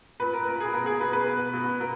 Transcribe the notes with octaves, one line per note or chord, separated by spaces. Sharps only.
A#2 B4
A#4
A#2 A#4
G#4
B2 A#4
G#4
B2 B4
B4
B2
B2
B2 A#4